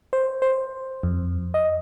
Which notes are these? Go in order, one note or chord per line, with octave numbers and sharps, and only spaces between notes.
C5
C5
F2
D#5